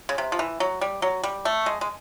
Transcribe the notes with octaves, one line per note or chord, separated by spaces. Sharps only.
C#3
C3
F3
E3
F#3
G3
F#3
G3
A3
G#3
G#3